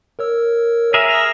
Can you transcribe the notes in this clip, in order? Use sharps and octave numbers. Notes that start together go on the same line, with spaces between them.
A#4 C#5 E6
G#4 A#4 E5
D#6 E6 A#6